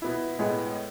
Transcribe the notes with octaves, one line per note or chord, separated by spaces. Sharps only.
B2 B3 E4
A2 G#3 B3